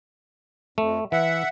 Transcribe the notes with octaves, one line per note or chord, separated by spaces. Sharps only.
F2 A3
E3 E5 F#5